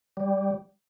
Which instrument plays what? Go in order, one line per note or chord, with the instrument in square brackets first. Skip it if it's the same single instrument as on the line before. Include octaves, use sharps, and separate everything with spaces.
[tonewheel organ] G3